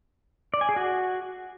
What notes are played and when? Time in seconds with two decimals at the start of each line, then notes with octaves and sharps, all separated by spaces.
0.54 D5
0.61 G#5
0.69 G#4
0.76 F#4